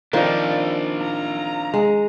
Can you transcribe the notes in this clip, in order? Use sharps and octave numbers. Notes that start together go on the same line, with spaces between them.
D#3 F3 C4 D4 F4 D5
A#5
G#3